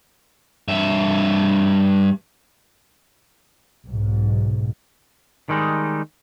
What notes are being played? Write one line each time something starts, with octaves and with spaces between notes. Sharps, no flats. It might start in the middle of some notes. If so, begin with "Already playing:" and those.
G2 E5
B1 G#2
D#3 G3 G#3 D#4